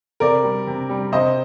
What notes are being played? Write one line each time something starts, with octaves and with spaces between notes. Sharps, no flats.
C3 A#4 D5
G3
C3
G3
C3 C5 D#5